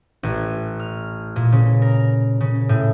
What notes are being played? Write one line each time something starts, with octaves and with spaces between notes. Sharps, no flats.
A1
F6
A#2
C#3
A#4
C#3
A2